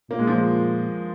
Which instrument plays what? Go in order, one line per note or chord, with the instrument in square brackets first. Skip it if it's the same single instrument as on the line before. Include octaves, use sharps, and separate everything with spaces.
[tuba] A#2 [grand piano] A#3
[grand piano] G#3
F3
G#3